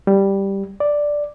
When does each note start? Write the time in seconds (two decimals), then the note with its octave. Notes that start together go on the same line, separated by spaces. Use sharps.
0.07 G3
0.80 D5